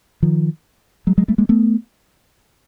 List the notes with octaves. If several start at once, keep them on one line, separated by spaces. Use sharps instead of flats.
D#3 F3
F#3 G#3
F#3 G#3
G3 A3
G#3 A#3
A3 B3